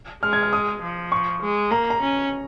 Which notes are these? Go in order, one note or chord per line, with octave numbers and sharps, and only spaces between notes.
G#3 F6
G#6
F6
D#6
F3
C#6
G#3
A#3 A#5
A#5
C#4